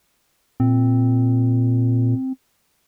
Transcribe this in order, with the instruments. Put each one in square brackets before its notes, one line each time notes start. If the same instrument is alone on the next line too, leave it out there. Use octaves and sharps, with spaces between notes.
[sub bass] A#2 [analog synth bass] C4